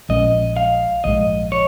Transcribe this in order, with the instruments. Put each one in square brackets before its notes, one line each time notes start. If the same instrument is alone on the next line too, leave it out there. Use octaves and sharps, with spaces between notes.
[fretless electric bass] A#1 A#2 G#3 C#4 [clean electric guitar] D#5
[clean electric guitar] F5
[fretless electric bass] A#1 G#2 G#3 [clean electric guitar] D#5
[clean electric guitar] C#5